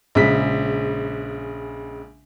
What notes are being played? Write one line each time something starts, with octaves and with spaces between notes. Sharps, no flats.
A#1 C#3 G#3 B6